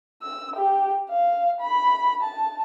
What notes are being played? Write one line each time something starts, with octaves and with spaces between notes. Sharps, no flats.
E6
G4
F5
B5
A5